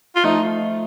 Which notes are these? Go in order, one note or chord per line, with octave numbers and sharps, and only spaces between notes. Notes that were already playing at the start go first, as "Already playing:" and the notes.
F4
F3 A3 D#4